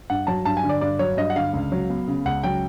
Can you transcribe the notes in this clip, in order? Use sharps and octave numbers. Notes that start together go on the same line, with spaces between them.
G2 F#5
F#3 A5
G2 A5
G#5
D3
D5
G2 D5
F#3 C#5
G2 D#5
F#5
D3 F5
C#2
F#3
B3
C#3
C#2 F#5
F#3 G5